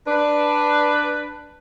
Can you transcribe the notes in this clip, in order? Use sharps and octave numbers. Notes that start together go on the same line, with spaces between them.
D4 B4